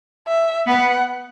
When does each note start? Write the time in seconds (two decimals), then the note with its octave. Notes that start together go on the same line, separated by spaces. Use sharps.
0.28 E5
0.68 B3 F#5